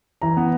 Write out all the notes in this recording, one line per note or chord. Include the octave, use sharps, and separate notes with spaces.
E3 A#5
B3